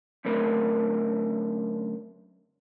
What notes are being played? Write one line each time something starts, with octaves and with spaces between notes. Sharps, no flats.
F#2 D3 A3 C4 A#4 B4